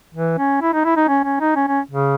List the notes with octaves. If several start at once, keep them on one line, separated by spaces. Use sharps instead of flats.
E3
C#4
E4
D#4
E4
D#4
C#4
C#4
D#4
C#4
C#4
C#3